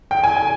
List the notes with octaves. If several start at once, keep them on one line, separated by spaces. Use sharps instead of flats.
G5
G#5
G#5